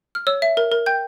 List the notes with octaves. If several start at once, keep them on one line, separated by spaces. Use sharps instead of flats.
F6
C#5 E6
E5
A#4
A#4
G5 G6